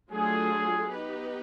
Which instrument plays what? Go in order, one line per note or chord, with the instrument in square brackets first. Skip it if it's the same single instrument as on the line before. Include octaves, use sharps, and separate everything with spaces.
[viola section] F#3 A3 D4 F4 A4 [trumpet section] G#4
[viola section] B3 D#4 G4 B4